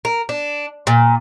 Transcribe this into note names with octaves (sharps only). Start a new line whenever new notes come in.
A#4
D4
A#2